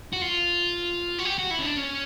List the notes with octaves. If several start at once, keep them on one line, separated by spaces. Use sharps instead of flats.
F#4
F4
F#4
G4
F#4
E4
C#4
D4
C#4